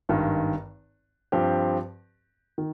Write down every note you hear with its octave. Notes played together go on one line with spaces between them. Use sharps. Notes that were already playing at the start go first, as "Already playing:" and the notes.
G#1 G2 D#3
G2 F3 C4 G4
D#3